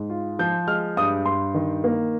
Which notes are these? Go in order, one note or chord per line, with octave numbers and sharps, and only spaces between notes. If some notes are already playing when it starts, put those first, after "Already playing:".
Already playing: G#2
F4
F3 G6
G#3 F6
G2 D#6
G2 C6
D#3
A#3